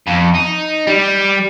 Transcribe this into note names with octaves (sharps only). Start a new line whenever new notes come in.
F2
D#4
G3